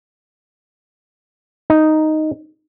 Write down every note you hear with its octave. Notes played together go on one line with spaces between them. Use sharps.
D#4